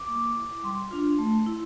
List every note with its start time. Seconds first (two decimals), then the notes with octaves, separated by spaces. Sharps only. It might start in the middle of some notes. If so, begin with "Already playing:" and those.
Already playing: D6
0.08 A#3
0.36 E4
0.63 G3 C6
0.91 D4 F4
1.19 A3
1.46 E4